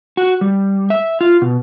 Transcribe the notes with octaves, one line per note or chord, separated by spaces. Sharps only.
F#4
G3
E5
F4
B2